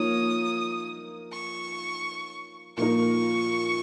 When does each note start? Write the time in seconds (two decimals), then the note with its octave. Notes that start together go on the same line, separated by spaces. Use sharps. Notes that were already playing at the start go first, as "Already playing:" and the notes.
Already playing: F3 A#3 D#4 A#4 C#5 D#6
1.31 C#6
2.77 A#2 F3 A#3 D#4 A#4 C#6